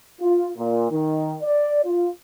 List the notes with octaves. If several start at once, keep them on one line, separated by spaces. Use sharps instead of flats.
F4
A#2
D#3
D5
F4